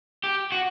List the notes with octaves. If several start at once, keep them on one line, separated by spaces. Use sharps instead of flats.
G4
F#4